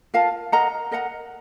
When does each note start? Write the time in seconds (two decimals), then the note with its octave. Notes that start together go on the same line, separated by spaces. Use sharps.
0.14 F4 A#4 F5 A5
0.52 A#4 D#5 F#5 A#5
0.91 A#4 D#5 F#5 A#5